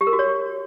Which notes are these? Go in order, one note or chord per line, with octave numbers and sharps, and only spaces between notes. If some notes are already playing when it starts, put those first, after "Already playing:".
G4
A#4
F#4
C#5